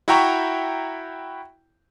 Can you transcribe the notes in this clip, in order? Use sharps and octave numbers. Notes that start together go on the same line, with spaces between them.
E4 F#4 E5 G5 A#5 C#6